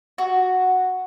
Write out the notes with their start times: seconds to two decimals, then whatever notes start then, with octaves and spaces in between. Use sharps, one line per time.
0.18 F#4